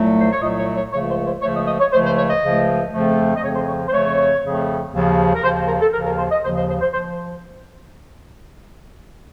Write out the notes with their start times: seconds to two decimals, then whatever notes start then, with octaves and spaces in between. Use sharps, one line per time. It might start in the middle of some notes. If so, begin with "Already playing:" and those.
Already playing: C2 A#2 F#3 A3
0.20 C5
0.31 C#5
0.42 C2 A#2 F#3 A3 D#5
0.59 C#5
0.75 C#5
0.92 C#2 C#3 F3 A3 C#5
1.09 C5
1.26 C5
1.42 C#2 C#3 F3 A3 C#5
1.55 D#5
1.67 D#5
1.80 C#5
1.93 C#2 C#3 F3 A3 C5
2.05 C5
2.18 C#5
2.30 D#5
2.42 C#2 C#3 F3 A3
2.93 F2 C#3 F3 A3
3.36 D#5
3.43 F2 C#3 F3 A3 C#5
3.55 C5
3.68 C#5
3.88 C5
3.92 F2 C#3 F3 A3 C#5
4.43 F2 C#3 F3 A3
4.93 D#2 C#3 F3
5.34 A#4
5.43 D#2 C#3 F3 C5
5.68 A#4
5.81 A4
5.93 D#2 C#3 F3 A#4
6.06 A#4
6.19 C5
6.31 D#5
6.43 D#2 C#3 F3 C5
6.56 C5
6.69 C5
6.81 C5
6.93 F3 C5